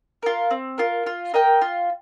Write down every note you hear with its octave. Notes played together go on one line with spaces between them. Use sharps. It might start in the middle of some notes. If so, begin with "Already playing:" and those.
F4 A#4
C4
F4 A#4
F4
A#4 D#5 G5
F4